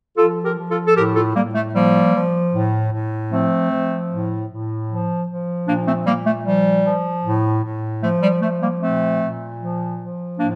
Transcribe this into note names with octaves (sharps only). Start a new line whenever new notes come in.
F3 F4 A4
G4 A#4
F3
F4 A4
A4
A2 G4 A#4
F4 A4
A2 G3 A#3
A3
F3 G3 A#3
F3
A2
A2
F3 A3 C4
F3
A2
A2
F3
F3
A#2 A#3 D4
A3 C4
A#2 G3 A#3
A3
F3 G3
F3
A2
A2
F3 A3
G3
F3 A3
G3 A#3
A#2 A3 C4
A#2
F3
F3
A2 A#3 D4